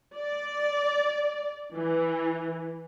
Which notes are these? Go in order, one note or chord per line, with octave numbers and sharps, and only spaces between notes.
D5
E3